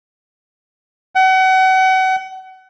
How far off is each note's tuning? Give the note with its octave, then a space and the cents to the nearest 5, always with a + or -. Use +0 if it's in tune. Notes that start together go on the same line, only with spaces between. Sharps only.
F#5 +35